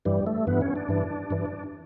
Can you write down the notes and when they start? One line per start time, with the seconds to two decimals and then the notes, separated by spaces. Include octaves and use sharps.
0.05 G2 E3 G3
0.27 A3
0.47 G2 E3 B3
0.61 C#4
0.75 D4
0.89 G2 E3
1.30 G2 E3